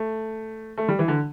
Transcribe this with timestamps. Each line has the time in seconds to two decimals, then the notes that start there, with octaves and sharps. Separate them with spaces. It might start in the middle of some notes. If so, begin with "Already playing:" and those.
Already playing: A3
0.78 A3
0.88 G3
0.99 E3
1.08 D3